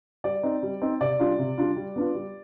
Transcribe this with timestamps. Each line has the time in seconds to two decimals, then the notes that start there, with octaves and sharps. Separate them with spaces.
0.24 G3 D5
0.43 C4 D#4
0.63 G3
0.81 C4 D#4
1.01 C3 D5
1.20 G3 D4 F4
1.39 C3
1.58 G3 D4 F4
1.76 G3
1.96 B3 D4 F4
2.15 G3